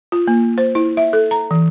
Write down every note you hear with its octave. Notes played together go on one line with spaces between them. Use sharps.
F4
A#3
C5
E4
E5
A4
A#5
E3